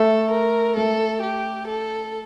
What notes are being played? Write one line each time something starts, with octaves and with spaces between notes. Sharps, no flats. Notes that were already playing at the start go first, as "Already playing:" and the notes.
Already playing: A3 A4
A#4
A3 A4
G4
A4